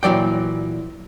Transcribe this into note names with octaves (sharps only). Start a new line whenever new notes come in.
A#2 E3 F#3 D5 G5